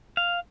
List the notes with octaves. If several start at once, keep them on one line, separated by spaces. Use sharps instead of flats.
F5